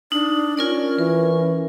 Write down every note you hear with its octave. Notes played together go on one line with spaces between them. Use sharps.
D4 D#4
C#4 F4 A#4 D5
E3 A#4